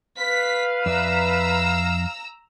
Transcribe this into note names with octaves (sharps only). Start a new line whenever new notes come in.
B4 F5 B6
F2 D5 E5 A#5 E6